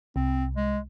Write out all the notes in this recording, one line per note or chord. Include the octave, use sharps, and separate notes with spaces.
C2 C4
G#3